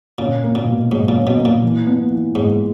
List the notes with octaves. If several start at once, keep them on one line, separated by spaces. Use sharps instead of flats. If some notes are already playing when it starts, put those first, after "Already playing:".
A#2 C#4
A#3
A#2
B2
G#2 F#3
A#2
C#4
B2
A#3
A#2
E3
B3
E3
G#2 G#3